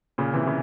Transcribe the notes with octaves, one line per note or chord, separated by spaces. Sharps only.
A#2 C#3
C3 E3
C#3